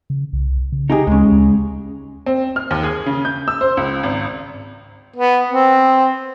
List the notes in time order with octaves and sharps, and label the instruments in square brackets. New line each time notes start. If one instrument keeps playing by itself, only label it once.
[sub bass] C#3
C2
C#3
[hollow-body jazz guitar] D#4 G4 G#4
[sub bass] D2 [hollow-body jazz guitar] C#3 G#3
[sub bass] D2
[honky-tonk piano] C4
F6
D#2
G#4
C#3
G6
E6
C5
C#2
G#1
[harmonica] B3
C4